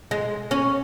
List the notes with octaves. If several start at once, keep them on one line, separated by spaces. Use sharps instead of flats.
G#3
C#4